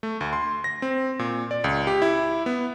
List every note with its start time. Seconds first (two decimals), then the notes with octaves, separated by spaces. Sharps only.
0.03 A3
0.21 D2
0.33 C6
0.64 A#6
0.82 C4
1.19 A#2
1.51 D5
1.64 C#2
1.87 G4
2.02 E4
2.46 B3